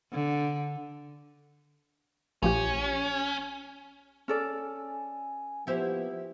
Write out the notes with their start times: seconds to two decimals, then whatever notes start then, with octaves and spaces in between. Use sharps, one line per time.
0.12 D3
2.43 A#1 F3 C#4 G4
4.28 C#4 A4 D5 G#5
5.67 F3 A#3 B3 E4 G4 C5